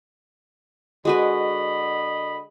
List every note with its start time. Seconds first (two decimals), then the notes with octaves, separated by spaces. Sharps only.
1.05 D3 G#3 F#4 B4 D#5 B5